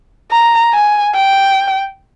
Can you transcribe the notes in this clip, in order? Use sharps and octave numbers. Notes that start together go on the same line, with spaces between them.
A#5
G#5
G5